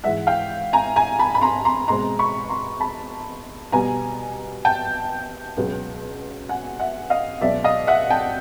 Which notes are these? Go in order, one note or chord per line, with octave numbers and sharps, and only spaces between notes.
G#2 E3 G#3 E5 F#5
F5 G5
G#5 A#5
G#5 A#5
A5 B5
B5
A#5 C6
A#5 C6
B2 G#3 C4 A#5 C6
B5 C#6
A#5 C6
A5 B5
B2 G3 B3 G#5 A#5
G5 A5
C#2 B2 F#3 B3
F#5 G#5
E5 F#5
D#5 F5
C#2 B2 F#3 D5 E5
D#5 F5
E5 F#5
G5 A5